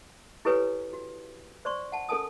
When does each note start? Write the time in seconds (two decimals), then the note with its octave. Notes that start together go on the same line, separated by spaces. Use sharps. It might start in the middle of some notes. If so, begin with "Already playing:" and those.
0.45 E4 G4 A4 B4 C#5 G#5
0.93 F#4
1.65 C5 D5 C6 C#6
1.92 F#5 A5
2.09 C#4 A4 A#4 G#5 A5 D#6